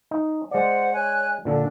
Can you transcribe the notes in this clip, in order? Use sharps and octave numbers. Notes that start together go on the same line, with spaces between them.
D#4
G#3 C5 D5 F#5
C#5 G#5 F#6
A#2 D3 D4 A4